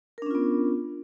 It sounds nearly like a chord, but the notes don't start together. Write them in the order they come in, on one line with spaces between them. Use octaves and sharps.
A#4 D4 C#4 F4 B3